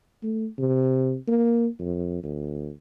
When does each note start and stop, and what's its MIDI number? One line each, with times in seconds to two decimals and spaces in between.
0.23 0.47 57
0.59 1.15 48
1.28 1.67 58
1.80 2.22 41
2.23 2.70 38